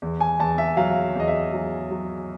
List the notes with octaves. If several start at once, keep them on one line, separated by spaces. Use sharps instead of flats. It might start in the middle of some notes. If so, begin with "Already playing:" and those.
E2
G#5
E2 A5
E5
F#3 F5
E2 D#5
E5
F#3
F#3